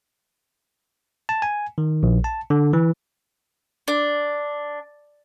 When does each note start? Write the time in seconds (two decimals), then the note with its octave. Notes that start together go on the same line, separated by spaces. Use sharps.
1.29 A5
1.42 G#5
1.78 D#3
2.03 A#1
2.24 A5
2.50 D3
2.73 E3
3.88 D4